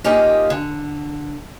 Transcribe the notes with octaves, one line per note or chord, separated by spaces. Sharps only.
A#3 C#4 D#4 F4 G4 D#5
D3